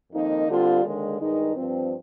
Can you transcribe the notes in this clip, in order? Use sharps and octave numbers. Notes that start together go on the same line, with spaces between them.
F2 D#3 A#3 D#4
D3 G3 C4 F4
D#2 D3 G#3
G2 D#3 G#3 D#4
G2 F3 C4